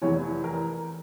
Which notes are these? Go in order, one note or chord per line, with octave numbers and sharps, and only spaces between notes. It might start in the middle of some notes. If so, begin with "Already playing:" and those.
F1 E2 E3 C#5
A#4